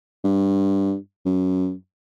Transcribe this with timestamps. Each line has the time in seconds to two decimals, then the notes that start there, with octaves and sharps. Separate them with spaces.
0.24 G2
1.26 F#2